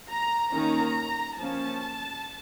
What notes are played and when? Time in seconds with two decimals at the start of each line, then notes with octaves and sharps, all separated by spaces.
0.09 A#5
0.52 D#3 A#3 C#4 A#5
1.38 F3 A#3 C#4 A5